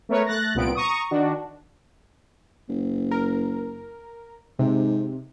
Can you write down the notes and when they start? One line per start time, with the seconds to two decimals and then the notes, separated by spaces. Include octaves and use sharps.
0.09 A3 B3 A#4 B4 C#5
0.26 A3 F#6 A6 A#6
0.54 C2 A#2 B3 C4 D7
0.75 A#5 C#6 D#6
1.11 D#3 D4 F#4
2.69 F#1
3.11 A#4
4.59 G#2 C3